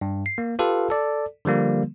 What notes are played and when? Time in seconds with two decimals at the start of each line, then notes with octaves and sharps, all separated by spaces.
0.01 G2
0.26 C7
0.38 A#3
0.59 F4 G4 A4 B4 F5
0.90 A4 D5
1.45 D3 F3 G3 A#3